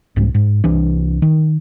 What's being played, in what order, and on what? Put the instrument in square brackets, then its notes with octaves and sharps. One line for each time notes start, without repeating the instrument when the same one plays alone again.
[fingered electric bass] C2 G#2
G#2
C2 E3 D4
D#3